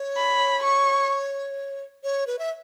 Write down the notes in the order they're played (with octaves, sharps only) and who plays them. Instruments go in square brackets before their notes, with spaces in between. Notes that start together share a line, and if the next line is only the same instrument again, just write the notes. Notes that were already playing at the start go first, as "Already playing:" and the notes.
Already playing: [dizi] C#5
[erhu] B5
C#6
[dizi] C#5
B4
E5